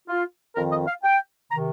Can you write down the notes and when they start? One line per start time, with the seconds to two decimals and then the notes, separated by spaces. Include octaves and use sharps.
0.08 F4
0.56 F2 D#3 A#4
0.72 D#5
0.87 F5
1.03 G5
1.50 C3 D#3 A#5